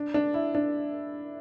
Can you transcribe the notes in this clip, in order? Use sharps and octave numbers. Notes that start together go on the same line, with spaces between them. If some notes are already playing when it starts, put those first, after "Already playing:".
Already playing: D4
D4
E4
D4